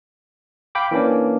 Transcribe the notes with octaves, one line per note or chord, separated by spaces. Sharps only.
F5 G5 B5 D6
E3 A#3 C#4 D4